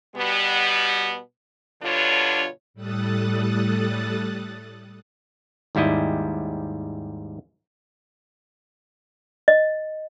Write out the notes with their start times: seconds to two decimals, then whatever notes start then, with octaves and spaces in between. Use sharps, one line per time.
0.16 B2 G3 B3
1.83 G2 B2 D3 D4 F4 C#5
2.74 A2 G3 A4 D#6 F#6 A6
5.75 D#2 G#2 G3 E4 D#5
9.48 D#5